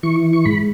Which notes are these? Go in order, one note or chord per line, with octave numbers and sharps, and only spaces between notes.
E3 C#6
C#6
G#2 B5